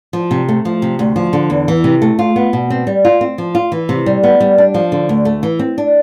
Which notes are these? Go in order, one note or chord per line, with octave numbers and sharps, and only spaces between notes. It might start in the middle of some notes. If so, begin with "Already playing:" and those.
F3
C3
A3
F3
C3
D2
F3
D3
E2
E3
C3
A3
F4
B3
B2
C4
G3
F4
C4
F3
F4
E3
C3
G3
B3
G3
D4
F3
D3
D2
A3
E3
C4
D4